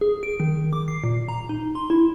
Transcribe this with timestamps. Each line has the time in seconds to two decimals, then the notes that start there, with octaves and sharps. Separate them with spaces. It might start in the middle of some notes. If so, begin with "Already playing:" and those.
0.01 G#4
0.23 D7
0.40 D#3
0.73 D6
0.88 C7
1.04 A#2
1.29 A#5
1.49 D#4
1.75 C6
1.90 E4